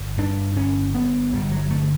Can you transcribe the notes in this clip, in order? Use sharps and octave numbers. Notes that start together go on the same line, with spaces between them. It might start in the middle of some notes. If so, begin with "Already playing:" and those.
Already playing: G1
G2 D4
G1 C#4
G2 B3
G1 G3
F#3
D3 A3